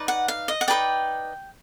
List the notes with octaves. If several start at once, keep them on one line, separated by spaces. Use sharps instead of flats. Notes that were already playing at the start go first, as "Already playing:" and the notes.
Already playing: D#4 B4 D5
F#5
F5
D#5
F#5
D#4 G#4 B4 D5 G5